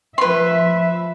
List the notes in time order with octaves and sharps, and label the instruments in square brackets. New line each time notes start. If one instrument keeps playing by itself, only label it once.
[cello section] F3 E5 [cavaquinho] B4 C6